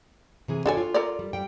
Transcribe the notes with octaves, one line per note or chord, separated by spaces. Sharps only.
C3 E3 G#4
D4 F#4 A4 C#5 G5 G#5
F4
A4 A#4 D5
G3
G3 G5